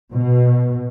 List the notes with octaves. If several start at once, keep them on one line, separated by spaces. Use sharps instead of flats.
B2